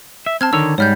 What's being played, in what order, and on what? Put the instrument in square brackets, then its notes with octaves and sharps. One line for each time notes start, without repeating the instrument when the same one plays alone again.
[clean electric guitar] E5
[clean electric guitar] C4 [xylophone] A5 F6 G#6
[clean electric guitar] D3 D#3 C#5 [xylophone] E6
[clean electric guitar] G#2 G3 [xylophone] C#5 F6 G6